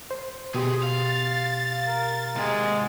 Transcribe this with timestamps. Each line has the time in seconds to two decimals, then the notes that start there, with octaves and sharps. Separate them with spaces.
0.11 C5
0.54 B2 G4 G#4 B4 C6
0.83 F5 A6
1.87 A#4
2.36 G#2 C3 G#3